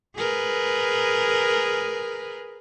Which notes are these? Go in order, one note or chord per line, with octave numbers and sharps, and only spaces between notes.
G#4 A#4 B4